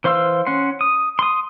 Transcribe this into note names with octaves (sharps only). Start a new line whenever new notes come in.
E3 C5 F5 C6 E6
C#4 F#5 C6
D#6
C6 D#6